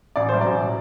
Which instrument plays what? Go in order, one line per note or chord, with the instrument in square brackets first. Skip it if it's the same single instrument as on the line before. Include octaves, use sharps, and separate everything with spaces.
[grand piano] A1 D5
A2 F#3 C5
A1 D5
A2 F#3